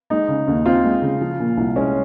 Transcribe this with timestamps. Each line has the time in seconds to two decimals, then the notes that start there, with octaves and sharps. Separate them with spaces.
0.10 G#3 D#4
0.28 C#3
0.48 D#2
0.66 C4 F4
0.85 G#3
1.02 C#3
1.21 F3
1.40 A#2
1.57 C2
1.76 G#3 C#4